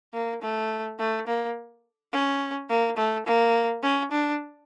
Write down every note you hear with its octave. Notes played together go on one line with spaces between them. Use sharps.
A#3
A3
A3
A#3
C#4
A#3
A3
A#3
C#4
D4